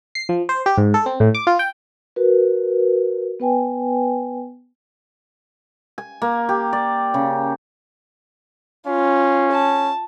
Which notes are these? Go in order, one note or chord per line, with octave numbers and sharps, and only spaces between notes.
C7
F3
C5
G4
G#2
A4
C4
A2
D6
F4
G5
F#4 A#4 B4
B3 B4 G5 G#5
G#5
A#3
G4
D5
C#3
C#4 F4
A5